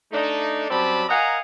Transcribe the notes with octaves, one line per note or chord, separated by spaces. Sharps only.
A3 D4 D#4
F#2 F#3 G3 C4 A5 B5
A#4 D#5 F5 F#5 G#5 A#5